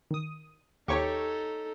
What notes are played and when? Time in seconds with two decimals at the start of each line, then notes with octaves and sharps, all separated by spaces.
0.11 D#3 D#6
0.88 D#2 D#4 G4 A4 C#5 C#6